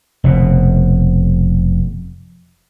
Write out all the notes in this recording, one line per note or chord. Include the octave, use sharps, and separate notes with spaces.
F1 B2